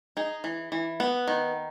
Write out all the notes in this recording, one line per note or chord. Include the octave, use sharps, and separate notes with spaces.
D#4 G#4
E3
E3
B3
D#3